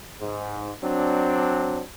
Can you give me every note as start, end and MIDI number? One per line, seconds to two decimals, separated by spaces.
0.20 0.72 44
0.83 1.81 54
0.83 1.81 60
0.83 1.81 62